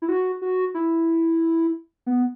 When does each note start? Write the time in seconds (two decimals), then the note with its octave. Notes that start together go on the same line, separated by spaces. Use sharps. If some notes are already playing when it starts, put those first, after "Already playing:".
0.02 E4
0.09 F#4
0.42 F#4
0.74 E4
2.06 B3